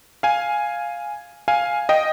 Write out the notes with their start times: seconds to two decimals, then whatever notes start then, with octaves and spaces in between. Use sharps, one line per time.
0.23 F5 G#5
1.48 F5 G#5
1.89 D#5 G5